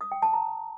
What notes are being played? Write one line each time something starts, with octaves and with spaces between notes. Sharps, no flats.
D#6
G5
A5
A#5